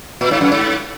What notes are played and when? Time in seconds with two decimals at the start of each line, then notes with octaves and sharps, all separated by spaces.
0.21 A#2
0.31 G#2
0.41 F#2
0.52 G#2